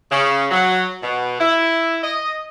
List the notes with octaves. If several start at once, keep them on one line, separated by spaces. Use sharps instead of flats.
C#3
F#3
B2
E4
D#5